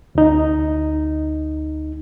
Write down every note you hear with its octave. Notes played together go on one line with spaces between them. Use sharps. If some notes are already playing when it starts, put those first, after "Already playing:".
D2 D#4